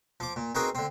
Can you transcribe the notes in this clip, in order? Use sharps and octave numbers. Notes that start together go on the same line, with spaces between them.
F3 D6
A#2
C4 D#4 F#4 G#4 A#4 B4
D3 C4